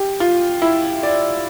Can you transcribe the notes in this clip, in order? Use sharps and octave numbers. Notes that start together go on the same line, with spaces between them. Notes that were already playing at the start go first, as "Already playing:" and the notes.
Already playing: G4
F4
E4
D5